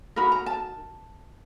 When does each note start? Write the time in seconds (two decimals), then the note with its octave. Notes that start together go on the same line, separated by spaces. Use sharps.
0.16 D#4 F#4 A#4 B5
0.32 A#5
0.46 A5